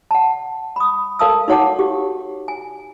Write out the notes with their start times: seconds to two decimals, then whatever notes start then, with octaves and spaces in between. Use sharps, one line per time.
0.11 F#5 A5
0.76 B5 D#6
1.19 A4 A#4 F5 A5 D#6 E6
1.48 D#4 F#4 C#5 F#5 A5 D6
1.79 F#4 G4
2.48 G#5